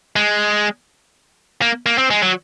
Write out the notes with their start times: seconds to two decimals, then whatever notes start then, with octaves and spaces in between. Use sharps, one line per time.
0.16 G#3
1.62 A#3
1.86 A#3
1.98 C4
2.10 G#3
2.22 F#3